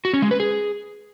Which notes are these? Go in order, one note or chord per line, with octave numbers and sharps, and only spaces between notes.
F#4
C#4
G#3
B4
G#4